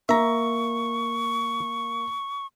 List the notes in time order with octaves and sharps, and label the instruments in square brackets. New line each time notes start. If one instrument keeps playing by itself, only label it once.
[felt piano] A#3 [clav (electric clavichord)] E5 A#5 [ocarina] C#6